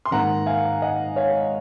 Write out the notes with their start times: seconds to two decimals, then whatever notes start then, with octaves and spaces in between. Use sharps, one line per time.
0.05 C6
0.11 G#2 D#3 A#3 F#5 A#5
0.46 F5 G#5
0.82 D#5 F#5
1.16 C#5 F5